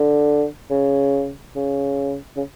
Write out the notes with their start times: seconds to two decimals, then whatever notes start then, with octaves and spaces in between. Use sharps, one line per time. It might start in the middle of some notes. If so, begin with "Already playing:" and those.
Already playing: D3
0.70 C#3
1.55 C#3
2.36 C#3